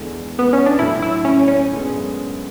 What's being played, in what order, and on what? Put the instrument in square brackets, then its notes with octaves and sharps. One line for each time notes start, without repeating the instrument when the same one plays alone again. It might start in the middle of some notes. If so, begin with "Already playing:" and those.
Already playing: [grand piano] E2 D3 G#3
[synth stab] B3
C#4
D4
[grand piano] A2 F#3 A3 [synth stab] E4
[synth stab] E4
C#4
C#4
[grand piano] F#2 D3 G#3 B3